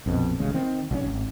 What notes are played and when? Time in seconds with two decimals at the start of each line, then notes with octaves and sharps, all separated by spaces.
0.06 A#1 F2 B2
0.39 D1 A1 C#3 G#3
0.54 D#3 C4
0.91 B1 F#3 C#4
1.06 G#1